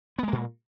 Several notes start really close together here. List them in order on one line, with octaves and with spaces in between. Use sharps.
B3 G#3 A#3 A#2